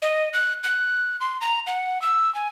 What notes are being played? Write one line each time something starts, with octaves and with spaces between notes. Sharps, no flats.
D#5
F#6
F#6
C6
A#5
F#5
E6
G#5